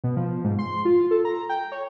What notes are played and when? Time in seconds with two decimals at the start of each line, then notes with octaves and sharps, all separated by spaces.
0.04 B2
0.17 F3
0.44 G#2
0.59 C6
0.85 F4
0.99 F4
1.11 A4
1.25 A#5
1.49 G5
1.72 C#5